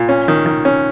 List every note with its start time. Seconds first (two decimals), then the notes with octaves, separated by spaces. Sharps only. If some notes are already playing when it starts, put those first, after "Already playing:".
Already playing: A#2
0.09 C#4
0.28 D#3
0.46 D#3
0.65 C#4